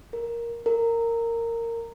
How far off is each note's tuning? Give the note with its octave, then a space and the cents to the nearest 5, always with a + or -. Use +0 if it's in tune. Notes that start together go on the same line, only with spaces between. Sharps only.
A#4 +5
A#4 -15